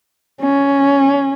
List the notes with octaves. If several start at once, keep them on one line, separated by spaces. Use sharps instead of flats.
C#4